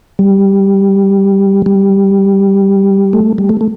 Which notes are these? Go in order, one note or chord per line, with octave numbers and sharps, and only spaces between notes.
G3
G3
A3
G3
A3
A3